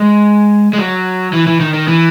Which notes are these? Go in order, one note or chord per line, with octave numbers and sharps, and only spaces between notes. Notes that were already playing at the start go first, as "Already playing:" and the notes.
Already playing: G#3
G#3
F#3
E3
E3
D#3
D#3
E3